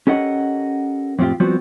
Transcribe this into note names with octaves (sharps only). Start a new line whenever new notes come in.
C#4 G4 A4 A#4 D#5 F#5
F2 A2 C4 D#4 F4 G4
F3 G3 B3 C4 F4 F#4